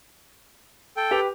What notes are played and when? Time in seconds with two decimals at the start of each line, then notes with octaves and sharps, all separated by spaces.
0.97 A4 G5
1.11 G4 B4 F7